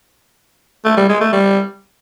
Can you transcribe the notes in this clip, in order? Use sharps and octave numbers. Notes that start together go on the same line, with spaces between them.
A3
G3
G#3
A3
G3